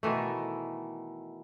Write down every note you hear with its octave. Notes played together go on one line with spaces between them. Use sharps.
B2 D#3 E3 A3